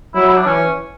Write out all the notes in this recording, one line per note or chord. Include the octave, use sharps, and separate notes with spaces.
F#3 E4
E4
D4
E3 C#4